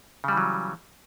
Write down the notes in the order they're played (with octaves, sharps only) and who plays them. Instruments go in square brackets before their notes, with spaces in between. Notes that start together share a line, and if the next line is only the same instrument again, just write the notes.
[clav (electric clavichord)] C#3
G3
E3
F#3